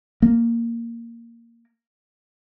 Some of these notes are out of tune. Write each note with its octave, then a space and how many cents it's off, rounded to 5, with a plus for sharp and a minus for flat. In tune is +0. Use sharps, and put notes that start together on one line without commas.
A#3 -5